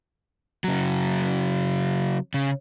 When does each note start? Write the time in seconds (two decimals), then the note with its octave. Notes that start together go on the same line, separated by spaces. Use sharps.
0.64 C#3 F#3
2.34 C#3